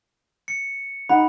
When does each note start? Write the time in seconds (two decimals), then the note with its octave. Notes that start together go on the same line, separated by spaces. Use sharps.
0.48 C#7
1.09 D#4 F#5 B5